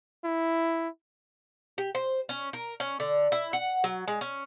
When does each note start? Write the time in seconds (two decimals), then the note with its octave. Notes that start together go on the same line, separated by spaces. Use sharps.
0.25 E4
1.78 G4
1.95 C5
2.29 C#4
2.53 A#4
2.80 C#4
3.00 D3
3.32 E4
3.53 F#5
3.84 F#3
4.07 G#3
4.21 C#4